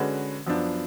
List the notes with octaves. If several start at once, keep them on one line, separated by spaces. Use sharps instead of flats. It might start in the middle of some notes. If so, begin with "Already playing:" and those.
Already playing: D3 G#3 C#4 F#4 B4
F#2 F3 B3 D4